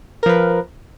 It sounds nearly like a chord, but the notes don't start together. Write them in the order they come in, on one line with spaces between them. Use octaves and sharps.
A#4 F3 B4